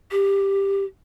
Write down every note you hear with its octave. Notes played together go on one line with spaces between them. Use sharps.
G4